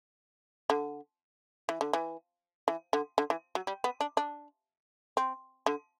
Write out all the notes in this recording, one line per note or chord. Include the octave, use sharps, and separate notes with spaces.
D3
E3
D3
E3
E3
D3
D3
E3
F#3
G3
B3
D4
D4
C4
D3